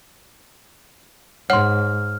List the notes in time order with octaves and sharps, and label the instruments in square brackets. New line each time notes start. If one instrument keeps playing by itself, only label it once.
[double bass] G#2 [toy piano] C#5 C6 [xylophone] F#5 [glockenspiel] F6